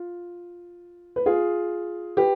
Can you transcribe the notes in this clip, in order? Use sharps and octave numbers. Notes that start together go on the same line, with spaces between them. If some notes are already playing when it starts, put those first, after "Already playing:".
Already playing: F4
B4
F4 G#4
G4 B4